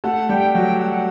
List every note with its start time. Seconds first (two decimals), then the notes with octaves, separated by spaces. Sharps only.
0.04 A3 A4 F#5
0.29 G3 G4 G5
0.54 F#3 F#4 G5
0.80 F#5